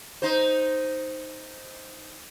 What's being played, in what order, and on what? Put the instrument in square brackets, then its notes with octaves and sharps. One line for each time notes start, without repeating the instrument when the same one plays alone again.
[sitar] D#4 C5